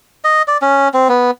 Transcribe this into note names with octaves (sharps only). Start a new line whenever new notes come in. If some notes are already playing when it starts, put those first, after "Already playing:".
D#5
D5
C#4
C4
B3